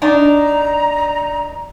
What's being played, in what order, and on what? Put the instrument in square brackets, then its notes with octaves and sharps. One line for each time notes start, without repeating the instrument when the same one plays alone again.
[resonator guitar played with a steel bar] D4 D#4 [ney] A#5